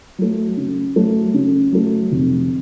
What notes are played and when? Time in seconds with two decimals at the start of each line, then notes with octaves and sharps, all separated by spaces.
0.18 F#3 A3
0.57 C#3
0.96 F#3 A3
1.34 C#3
1.72 F#3 A3
2.12 F1